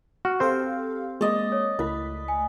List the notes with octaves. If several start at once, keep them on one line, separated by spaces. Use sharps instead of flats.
F#4 F6
C4 G4 A4 C5 F5
G#3 A#3 D5 D#5
C#5
C#2 A3 E4 B4 B6
G#5